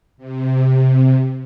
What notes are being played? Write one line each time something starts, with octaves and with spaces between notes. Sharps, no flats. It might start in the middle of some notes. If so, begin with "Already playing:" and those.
C3